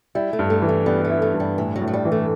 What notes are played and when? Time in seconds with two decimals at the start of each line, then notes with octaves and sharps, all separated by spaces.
0.15 G3 E4
0.33 A3
0.39 G2
0.50 A3
0.62 E3
0.69 A3
0.86 G3 B3
1.05 A3
1.10 E4
1.22 A3
1.34 G2
1.40 G3
1.58 A2 E3
1.76 F#3
1.81 A2
1.88 F#3
1.94 G3
2.05 E3
2.12 A3